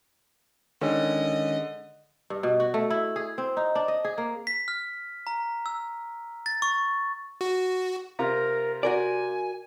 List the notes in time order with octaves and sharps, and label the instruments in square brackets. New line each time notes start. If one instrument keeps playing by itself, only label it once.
[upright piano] D3 [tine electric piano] D#3 G#3 C#4 [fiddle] D#5
[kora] G2
B2
F#4
A3
E4
G#4
C4
D#4
D4
D#5
G#4
A#3
[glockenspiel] B6
F6
A#5
E6
A6
C#6
[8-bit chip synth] F#4
[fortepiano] C3 F4 A#5 [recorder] A#4
[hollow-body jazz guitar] F#4 A#4 D5 [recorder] G#5